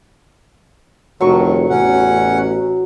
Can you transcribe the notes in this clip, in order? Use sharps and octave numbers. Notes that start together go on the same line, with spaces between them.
F1 G2 D#3 F#3 C#6
A1 E2 C#4 F#5